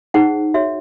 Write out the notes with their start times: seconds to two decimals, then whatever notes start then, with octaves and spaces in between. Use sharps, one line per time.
0.14 D#4 G#4 C5 F#5
0.54 F#4 C#5 E5